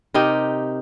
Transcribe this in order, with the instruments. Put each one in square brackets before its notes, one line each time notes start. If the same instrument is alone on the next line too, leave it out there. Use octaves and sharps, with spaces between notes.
[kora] C3 D#4 G4 A#4